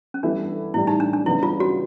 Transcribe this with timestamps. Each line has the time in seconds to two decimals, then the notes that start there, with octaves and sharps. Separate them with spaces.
0.14 C#4
0.23 E3 G3 B3 D4 E4 A4
0.74 A2 E3 G3 E4
0.87 D#4
1.00 D4
1.13 D4
1.26 C#3 E3 G3 B3 E4
1.43 F4
1.60 F#4